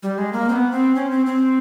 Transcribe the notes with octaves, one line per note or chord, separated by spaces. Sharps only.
G3
G#3
A#3
C4
B3
C4
C#4
C4
C4